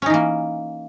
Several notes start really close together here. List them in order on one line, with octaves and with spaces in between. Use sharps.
C#4 D#4 E3 A#3